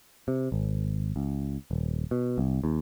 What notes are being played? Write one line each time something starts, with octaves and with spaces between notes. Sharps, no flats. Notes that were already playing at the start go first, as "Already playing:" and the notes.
C3
G#1
C#2
D#1
B2
C2
D#2